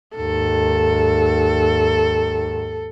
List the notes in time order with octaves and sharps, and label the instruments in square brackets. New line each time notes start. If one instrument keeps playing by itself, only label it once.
[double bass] D#2 G#2 [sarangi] A4